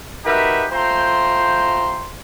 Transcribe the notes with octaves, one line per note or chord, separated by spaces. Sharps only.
D#4 F#4 G4 A#4 B4 E5
A3 F4 C5 G5 A#5 C6